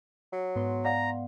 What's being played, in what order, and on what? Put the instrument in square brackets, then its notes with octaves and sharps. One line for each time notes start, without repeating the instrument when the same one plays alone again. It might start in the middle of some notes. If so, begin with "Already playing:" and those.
[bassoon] F#3
[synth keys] G#2 B3 C6
[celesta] D5 F5 F#5 [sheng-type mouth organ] A#5